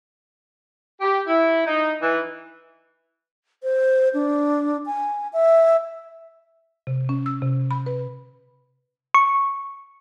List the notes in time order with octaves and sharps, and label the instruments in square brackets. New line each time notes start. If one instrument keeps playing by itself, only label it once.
[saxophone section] G4
E4
D#4
E3
[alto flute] C5
D4
G#5
E5
[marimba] C3
C#4
E6
C3
B5
B4
[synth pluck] C#6